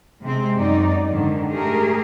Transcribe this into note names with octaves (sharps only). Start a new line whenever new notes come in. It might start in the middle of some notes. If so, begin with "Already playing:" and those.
C3 G#3 C4
F#2 D#4 D5
G#2 D3 D#3
A3 G4 G#4 A#4